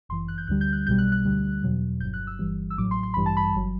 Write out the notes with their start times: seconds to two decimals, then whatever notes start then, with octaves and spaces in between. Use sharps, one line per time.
0.09 G1 F#2 E3 C6
0.28 F#6
0.38 G6
0.47 D2 D3 G3 F#6
0.61 G6
0.73 F#6
0.86 B1 B2 G3 G6
0.98 F#6
1.12 F#6
1.25 D2 D3 G3
1.63 E2 B2 F#3
2.01 G1 G2 F#3 G6
2.14 F#6
2.27 E6
2.39 G1 G2 E3 G3
2.70 E6
2.78 A1 A2 F#3 D6
2.91 C6
3.03 C6
3.14 A1 G2 E3 G3 B5
3.26 A5
3.37 B5
3.54 G1 F#3